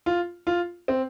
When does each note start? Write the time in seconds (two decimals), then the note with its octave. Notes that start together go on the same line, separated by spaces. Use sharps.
0.06 F4
0.47 F4
0.88 C4